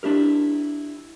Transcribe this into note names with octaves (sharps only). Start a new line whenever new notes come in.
D4 E4 G4 A#4